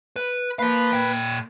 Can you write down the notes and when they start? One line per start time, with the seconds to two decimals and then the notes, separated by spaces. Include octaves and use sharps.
0.16 B4
0.59 A#3 B4 C5 F5
0.93 A#2 G5